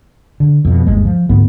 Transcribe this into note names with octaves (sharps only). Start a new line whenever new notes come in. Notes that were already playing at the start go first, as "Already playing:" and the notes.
D3
F2 B2
G1 D#2 G#3
F3
D2 G#2 B3